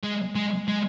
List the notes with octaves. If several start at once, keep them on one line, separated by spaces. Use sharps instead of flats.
G#3
G#3
G#3